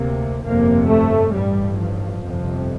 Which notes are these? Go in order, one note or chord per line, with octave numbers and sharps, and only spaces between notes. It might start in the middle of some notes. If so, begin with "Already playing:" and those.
Already playing: D2 C3 A#3
G1 F2 C3 A#3
A3
A1 G2 G3
F3
G1 F2 C3